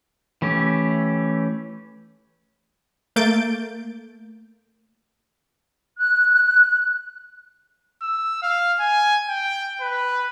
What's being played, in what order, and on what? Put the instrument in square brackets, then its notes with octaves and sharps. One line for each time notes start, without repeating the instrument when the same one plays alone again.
[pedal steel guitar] E3 A3 C#4 G4
[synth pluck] A3 A#3 G6 A6 D7
[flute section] F#6
[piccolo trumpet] E6
F5
G#5
G5
B4